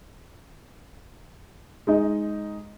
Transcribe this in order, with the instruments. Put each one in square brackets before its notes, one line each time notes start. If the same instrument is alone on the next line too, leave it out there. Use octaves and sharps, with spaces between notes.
[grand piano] G#3 D#4 D#5